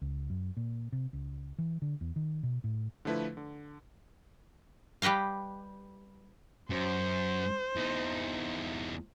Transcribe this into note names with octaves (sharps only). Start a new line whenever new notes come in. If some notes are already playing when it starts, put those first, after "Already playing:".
C#2
F#2
A#2
C3
C#2
E3
D3
E2
D#3
B2
A2
D3 F3 A3 E4 B4
D3
G3 G4 B4 D#5 F5
F#2 C5
E2 D#4